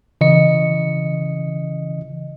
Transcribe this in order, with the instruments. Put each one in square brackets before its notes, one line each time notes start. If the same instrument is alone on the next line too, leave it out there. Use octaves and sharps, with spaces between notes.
[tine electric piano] C#3 E3 D#5 C#7